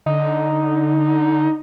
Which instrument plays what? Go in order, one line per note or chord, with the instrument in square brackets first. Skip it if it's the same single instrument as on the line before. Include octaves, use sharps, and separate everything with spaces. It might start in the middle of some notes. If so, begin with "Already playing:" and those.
[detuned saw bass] D3 [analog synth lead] D#4